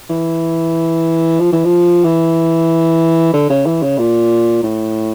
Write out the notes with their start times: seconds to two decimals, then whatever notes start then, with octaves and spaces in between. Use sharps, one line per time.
0.10 E3
1.40 F3
1.52 E3
1.65 F3
2.04 E3
3.34 D3
3.50 C#3
3.66 E3
3.82 C#3
3.99 A#2
4.63 A2